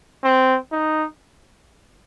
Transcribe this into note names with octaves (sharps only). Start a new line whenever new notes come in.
C4
D#4